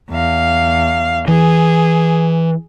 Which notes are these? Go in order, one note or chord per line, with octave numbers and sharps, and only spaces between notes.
E2 F5
E3 G#4